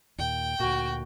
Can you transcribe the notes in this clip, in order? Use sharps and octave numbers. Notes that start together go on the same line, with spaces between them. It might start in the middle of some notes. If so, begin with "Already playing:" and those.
D#2 A#2 G5
D2 A#2 F#4